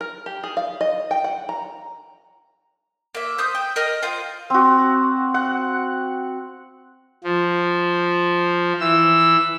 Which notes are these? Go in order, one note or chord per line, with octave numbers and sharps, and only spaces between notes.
A#4
G4
G#4
F5
D#5
G5
F#5
A#5
A#3 E5
C5 D#6 G6
G5
A#4 D#5 F6
F4 C5 G5
C4 F#4
F#5
F3
E3 E6